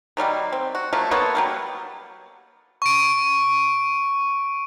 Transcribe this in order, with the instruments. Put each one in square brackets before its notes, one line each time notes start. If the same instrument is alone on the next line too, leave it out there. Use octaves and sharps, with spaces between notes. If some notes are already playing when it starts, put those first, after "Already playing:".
[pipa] D#3 F#3 G3 A#3
C4
F#4
F3 F#3 A3 A#3
A#3 B3 A4 C#5
F#3 G3 A#3
[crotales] C#6 D7